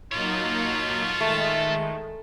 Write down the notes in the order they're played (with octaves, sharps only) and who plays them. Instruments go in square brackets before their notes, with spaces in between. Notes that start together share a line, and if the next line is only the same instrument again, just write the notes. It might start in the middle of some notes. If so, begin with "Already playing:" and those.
[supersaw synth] F#3 A#3 D#4 [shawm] F4 [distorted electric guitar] A4 C#5
[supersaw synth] D#3 G#3 [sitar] A3